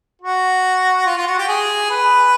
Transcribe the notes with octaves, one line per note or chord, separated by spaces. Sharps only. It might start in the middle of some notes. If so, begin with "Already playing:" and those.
F#4
F4
F4
F#4
G4
G#4
B4